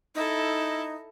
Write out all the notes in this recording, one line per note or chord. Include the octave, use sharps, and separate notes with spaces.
D#4 E4 A4